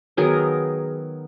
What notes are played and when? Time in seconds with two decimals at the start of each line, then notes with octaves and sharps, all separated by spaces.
0.17 D#3 F#3 B3 G#4 A#4